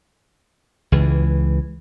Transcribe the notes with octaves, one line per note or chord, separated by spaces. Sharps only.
C#2 E3